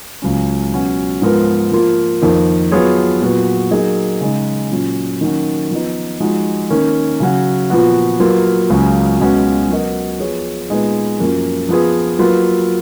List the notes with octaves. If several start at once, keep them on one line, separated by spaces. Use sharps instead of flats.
C#2 C#3 F#3 C#4
B2 F#3 C#4 F#4
G#2 F3 B3 F4 A#4
F3 A#3 F4
F2 D#3 A#3
F#3 B3 F4 G#4 C#5
A#2 F#3 B3 F#4
F#3 A#3 D#4 G#4 D#5
C#3 G#3 D#4
A#2 F#3 C#4
D#3 F#3 A#3 C#4 F#4
F3 B3 D#4
F3 G#3 D#4 F#4
D#3 A#3 C#4
C#3 F#3 C#4 F#4
A#2 F3 B3 F#4
F#3 A#3 F4 B4
C#2 C#3 F#3 A#3 C#4
C#2 B2 G#3 C#4 F#4
F#3 B3 F#4 A#4 D#5
F3 B3 F4 G#4 C#5
A#2 G#3 B3 D#4 G#4
F#2 F3 A#3 C#4
F3 B3 F4 G#4
F#3 A#3 F4 B4